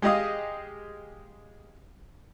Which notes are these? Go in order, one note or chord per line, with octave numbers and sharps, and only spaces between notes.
G#3 G4 G#4 D#5 F5 D#6